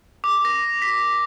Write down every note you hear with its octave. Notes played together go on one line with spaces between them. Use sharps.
D6
A#6
B6